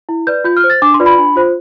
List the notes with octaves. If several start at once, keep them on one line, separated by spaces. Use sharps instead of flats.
E4
B4 D5 G6
F4 G6
F6
C5
A6
D4 D6
C6
F4 B4 D5
B5
D4
F4 C5